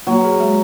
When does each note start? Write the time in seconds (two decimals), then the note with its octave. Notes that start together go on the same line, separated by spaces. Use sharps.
0.07 F#3 A#3
0.24 G#4
0.40 G#3